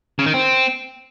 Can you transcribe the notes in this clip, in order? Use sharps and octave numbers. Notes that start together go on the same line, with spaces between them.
C#3
D#3
C4